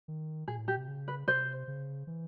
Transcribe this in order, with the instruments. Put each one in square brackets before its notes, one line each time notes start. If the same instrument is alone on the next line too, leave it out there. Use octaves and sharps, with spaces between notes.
[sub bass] D#3
[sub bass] A#2 [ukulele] G#4
[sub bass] A2
[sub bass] A#2 [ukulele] G4
[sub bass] C3
C#3
[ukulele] B4
[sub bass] C3 [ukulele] C5
[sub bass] C#3
E3